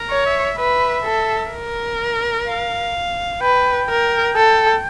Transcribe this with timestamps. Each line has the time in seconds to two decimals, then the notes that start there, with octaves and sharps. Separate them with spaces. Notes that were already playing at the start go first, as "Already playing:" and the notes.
Already playing: A#4
0.10 C#5
0.26 E5
0.58 B4 E5
1.04 A4
1.52 A#4
2.47 F5
3.41 B4 G5
3.89 A#4
4.36 A4